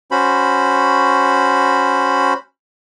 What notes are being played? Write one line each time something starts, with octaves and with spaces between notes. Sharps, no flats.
C#4 F#4 C5 B5